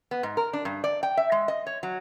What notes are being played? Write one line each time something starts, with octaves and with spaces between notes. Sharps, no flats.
B3
G#2
A#4
D4
G2
D5
G5
E5
G#3
D#5
C#5
F#3